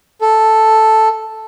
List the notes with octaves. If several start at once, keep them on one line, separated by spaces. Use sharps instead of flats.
A4